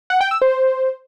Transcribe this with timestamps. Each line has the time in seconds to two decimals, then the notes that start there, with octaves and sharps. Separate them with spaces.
0.10 F#5
0.21 G5
0.31 E6
0.42 C5